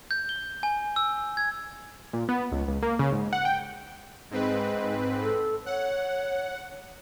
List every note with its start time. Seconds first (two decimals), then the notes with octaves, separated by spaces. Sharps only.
0.11 G6
0.29 G7
0.63 G#5
0.96 E6
1.37 G#6
2.13 A#2
2.28 B3
2.52 C#2
2.68 C#2
2.82 A#3
2.99 C#3
3.12 G#2
3.33 F#5
3.45 G5
4.31 G#2 G#3 C4 B4
5.22 A4
5.66 C#5 F#5